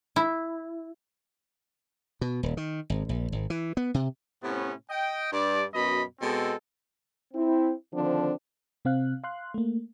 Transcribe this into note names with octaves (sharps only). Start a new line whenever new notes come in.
E4
B2
D#1
D#3
G#1
A#1
G#1
E3
B3
C3
A2 C3 B3 C#4
D#5 G5
G2 D5
F#2 B2 D#5 B5
B2 G#3 C4 A4
C4 E4
D3 D#3 F3 C4 D4
C3 C4 F5 F#6
F5 C6 F#6
A3 A#3